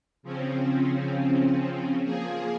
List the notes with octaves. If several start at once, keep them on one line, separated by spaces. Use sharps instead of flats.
C#3 F3 C4 C#4
F3 A#3 G#4